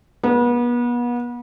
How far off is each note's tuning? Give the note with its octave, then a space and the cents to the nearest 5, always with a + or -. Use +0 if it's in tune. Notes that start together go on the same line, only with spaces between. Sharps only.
B3 -35